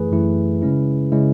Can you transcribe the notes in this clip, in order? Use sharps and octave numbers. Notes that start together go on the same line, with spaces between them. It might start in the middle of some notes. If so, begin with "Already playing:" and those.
Already playing: F#2 E3 A3 E4 G#4 B4
F#2 E3 A3 E4
C#3 G#3 C#4 E4
C#3 G#3 C#4 E4